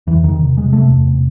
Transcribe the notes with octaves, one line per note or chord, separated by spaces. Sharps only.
E2 E3
E2 D#3
C3
C3 G#3
C3 A3
E2
C3